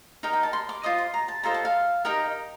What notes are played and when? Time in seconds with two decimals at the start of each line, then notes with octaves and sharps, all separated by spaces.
0.23 D#4 A#4 D#5 G5
0.33 G5
0.43 A5
0.53 C6
0.69 D6
0.83 F4 C5 D#5 D#6
0.98 C6
1.14 A#5
1.28 A5
1.43 F4 A4 C5 D#5 A#5
1.54 A5
1.65 F5
2.05 D#4 G4 A#4 D#5 G5